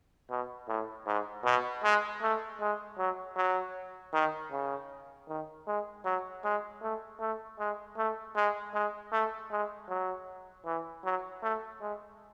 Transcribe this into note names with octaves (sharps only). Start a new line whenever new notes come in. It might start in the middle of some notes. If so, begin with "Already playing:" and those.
B2
A2
G#2
B2
G#3
A3
G#3
F#3
F#3
D#3
C#3
D#3
G#3
F#3
G#3
A3
A3
G#3
A3
G#3
G#3
A3
G#3
F#3
E3
F#3
A3
G#3